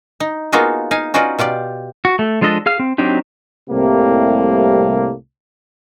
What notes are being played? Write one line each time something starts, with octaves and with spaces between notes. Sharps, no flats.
D#4
A#3 B3 D#4 F4 F#4 G#4
D#4 F5 G#5
C#4 D#4 F4 F#4 B4 D5
B2 F4 G4 D5
F#4
A3
F3 G#3 D4 A4 D#5
G#4 F5 F6
C4
F#3 C4 D4 D#4 G4
C2 A2 C3 G3 A#3